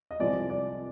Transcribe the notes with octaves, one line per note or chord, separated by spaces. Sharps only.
D#5
C2 C3 F3 G#3 D5
D5